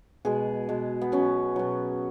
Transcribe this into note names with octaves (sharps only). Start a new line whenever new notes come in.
B2 G#3 G#4
B2 G#3
B3
B2 F#3 C#4
B2 F#3